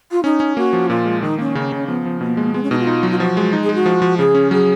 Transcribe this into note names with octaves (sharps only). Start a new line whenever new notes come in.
F4
C#4 D#4
C#4
A#3 F#4
F3
A#2 F4
G#3
D#3 D#4
A#3 C#4
C#3
C#3
F3 B3
F3
B2 A#3
G#3
G#3 B3
C#4
B2 D#4
F4
D#4
F#3
F4
F3 F#4
G#3
D#4
G#4
G#3
F#4
F3
F3
C#3 G#4
C#4
F#3 G#4